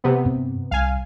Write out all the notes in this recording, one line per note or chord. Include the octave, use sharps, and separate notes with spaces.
C3 B3
G2 C4
C2 F5 G#5